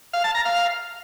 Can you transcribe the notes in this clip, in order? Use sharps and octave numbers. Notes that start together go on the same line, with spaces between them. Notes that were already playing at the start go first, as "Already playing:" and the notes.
F5
A5
A#5
F5